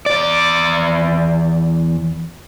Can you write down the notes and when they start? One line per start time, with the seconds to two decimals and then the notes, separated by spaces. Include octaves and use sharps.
0.06 E2 D5